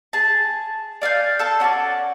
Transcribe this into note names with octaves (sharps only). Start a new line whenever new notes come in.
G#4 A5
D5 F5 G#5 G6
A4 A5
C#4 F#4 C5 D5